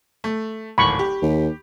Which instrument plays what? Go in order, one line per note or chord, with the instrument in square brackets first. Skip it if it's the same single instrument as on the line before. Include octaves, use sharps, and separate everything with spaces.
[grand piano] A3
[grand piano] D1 G#1 [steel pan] B5 C#6
[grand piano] G4
[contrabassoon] D#2